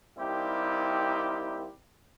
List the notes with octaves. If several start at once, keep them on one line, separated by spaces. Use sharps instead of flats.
G3 A#3 C4 D#4 E4 G4